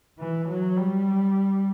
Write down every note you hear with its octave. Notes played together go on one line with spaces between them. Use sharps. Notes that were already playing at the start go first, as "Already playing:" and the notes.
E3
F#3
G3